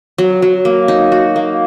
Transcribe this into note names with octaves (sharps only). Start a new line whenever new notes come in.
F#3
F#3
A#3
D#4
F#4
A#3